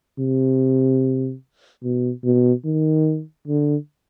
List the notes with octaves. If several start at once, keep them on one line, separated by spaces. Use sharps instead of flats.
C3
B2
B2
D#3
D3